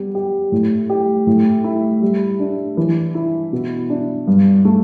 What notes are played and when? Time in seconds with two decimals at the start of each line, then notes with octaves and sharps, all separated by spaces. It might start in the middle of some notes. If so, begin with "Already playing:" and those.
Already playing: G3 B3
0.15 G4
0.52 A2
0.90 G4
1.27 A2
1.64 E4
2.02 G3
2.40 D4
2.77 E3
3.15 E4
3.53 B2
3.90 D4
4.27 G2
4.65 A3